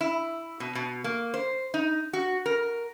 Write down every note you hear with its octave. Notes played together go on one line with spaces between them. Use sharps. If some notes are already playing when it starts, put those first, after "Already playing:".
E4
B2
B2
A#3
C5
D#4
F#4
A#4